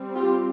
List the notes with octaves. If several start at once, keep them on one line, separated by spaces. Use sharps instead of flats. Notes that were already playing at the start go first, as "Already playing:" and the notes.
Already playing: G3 C4
F4 G4